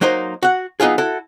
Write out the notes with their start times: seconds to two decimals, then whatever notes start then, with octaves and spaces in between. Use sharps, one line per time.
0.01 F#3 A#3 D#4 C5 D#5
0.43 F#4 F#5
0.80 F#3 B3 D#4 F4 G#4
0.98 E4 F#4 A4